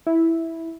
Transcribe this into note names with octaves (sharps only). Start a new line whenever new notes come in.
E4